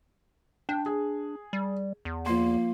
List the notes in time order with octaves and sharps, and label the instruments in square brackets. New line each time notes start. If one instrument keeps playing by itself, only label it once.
[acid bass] D4 [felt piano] G5
[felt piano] G#4
[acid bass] G3
E2
[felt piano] F3 C6 [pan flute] A#3